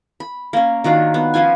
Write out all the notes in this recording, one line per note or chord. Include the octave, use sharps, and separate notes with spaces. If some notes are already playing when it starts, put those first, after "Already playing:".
B5
A#3 C#4
D#3 F#3 D4 F4
B3
F3 C#4 F4 G#5